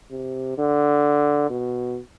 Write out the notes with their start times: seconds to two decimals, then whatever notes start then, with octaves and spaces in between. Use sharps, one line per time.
0.11 C3
0.58 D3
1.50 B2